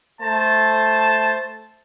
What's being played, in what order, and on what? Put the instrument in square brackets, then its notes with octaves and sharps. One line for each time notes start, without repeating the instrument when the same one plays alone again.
[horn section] A3 C5 A5